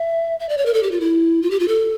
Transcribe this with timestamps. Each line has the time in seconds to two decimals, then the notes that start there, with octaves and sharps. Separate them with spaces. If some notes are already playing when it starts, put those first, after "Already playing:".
Already playing: E5
0.40 E5
0.49 D5
0.58 C#5
0.66 A#4
0.74 A4
0.83 G4
0.91 F4
1.00 E4
1.42 F4
1.51 G4
1.60 F4
1.68 A4